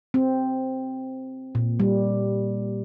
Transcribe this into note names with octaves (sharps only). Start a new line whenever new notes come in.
C4
A#2
G3